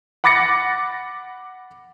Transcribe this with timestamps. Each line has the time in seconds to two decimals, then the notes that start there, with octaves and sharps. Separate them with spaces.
0.24 F#5 B5 D6 A6 A#6 C#7